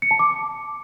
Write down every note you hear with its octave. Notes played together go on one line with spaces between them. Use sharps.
C#7
A5
D6